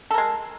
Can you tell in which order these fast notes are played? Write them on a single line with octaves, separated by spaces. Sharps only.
A4 A#4 G#3